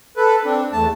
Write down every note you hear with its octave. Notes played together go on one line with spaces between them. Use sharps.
A4 B4
C4 D4
E2 A3 A5